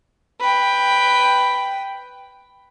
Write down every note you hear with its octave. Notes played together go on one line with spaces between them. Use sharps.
B4 G5